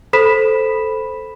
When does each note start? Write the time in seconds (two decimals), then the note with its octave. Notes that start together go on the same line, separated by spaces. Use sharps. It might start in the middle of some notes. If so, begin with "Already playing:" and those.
0.13 A4 C5 B5 B6 E7